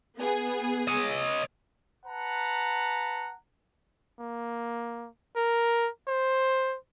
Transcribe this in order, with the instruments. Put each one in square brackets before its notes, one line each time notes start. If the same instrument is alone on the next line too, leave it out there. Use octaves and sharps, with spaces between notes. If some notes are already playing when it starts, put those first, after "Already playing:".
[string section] B3 G#4
[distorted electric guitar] C#5 D#5
[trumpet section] B4 F#5 A5 A#5
[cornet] A#3
A#4
C5